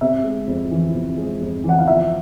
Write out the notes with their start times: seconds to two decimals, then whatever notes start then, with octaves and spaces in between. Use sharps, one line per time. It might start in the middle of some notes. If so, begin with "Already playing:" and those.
0.01 C3 E5
0.24 G#3
0.47 F2
0.71 E3
0.94 C3
1.17 G#3
1.41 F2
1.64 E3
1.69 F#5
1.79 F5
1.87 F3 E5